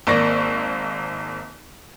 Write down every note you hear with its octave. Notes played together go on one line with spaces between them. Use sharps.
G#1 A#3 D5 C#6 A#6